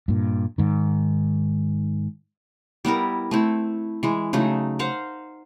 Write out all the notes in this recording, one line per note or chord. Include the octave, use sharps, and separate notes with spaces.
G2 A#2
G#2 D#3
G3 B3 E4 A#4
A3 C4 E4
E3 G#3
C#3 F#3 A3 D#4
C5 F5 F#5 A#5